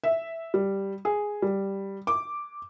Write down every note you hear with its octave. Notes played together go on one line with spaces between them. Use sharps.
E5
G3
G#4
G3
D6